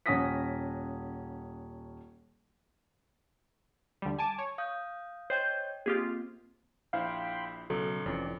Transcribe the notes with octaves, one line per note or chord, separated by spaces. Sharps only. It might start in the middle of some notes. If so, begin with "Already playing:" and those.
D#1 C#4 F#5 D#6 A#6 B6
D2 G3
G#5 A5 D6
C#5
F5 D#6 G6
C5 C#5 D#5 G5 G6
A#3 C4 F4 G4 G#4
A#1 E4 C5 F5 G5 B5 C6
B1 C#3 F#3 A4
F1 F2 E3 C#4 D5